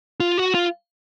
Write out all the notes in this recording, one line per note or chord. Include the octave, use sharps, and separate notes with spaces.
F4
F#4
F4